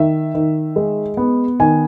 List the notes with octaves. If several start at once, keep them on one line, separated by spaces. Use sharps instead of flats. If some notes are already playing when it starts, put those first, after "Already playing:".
Already playing: D#3 E5
D#3
G#3
B3
D#3 G#5